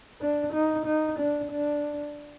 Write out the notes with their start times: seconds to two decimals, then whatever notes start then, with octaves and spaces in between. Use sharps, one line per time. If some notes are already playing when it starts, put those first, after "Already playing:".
0.21 D4
0.53 D#4
0.86 D#4
1.18 D4
1.51 D4